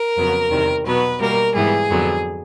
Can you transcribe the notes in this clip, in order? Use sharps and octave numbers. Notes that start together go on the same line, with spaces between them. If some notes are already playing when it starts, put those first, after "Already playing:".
Already playing: A#4
F2 C#3 F#3 B3
E2 C3 D#3 G3
B2 F#3 B3 B4
B2 G3 A#3 A#4
G#2 E3 G3 B3 G#4
F2 D3 F#3 B3